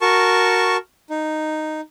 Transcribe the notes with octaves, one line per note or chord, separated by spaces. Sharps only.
F#4 A#4 A5 C#6
D#4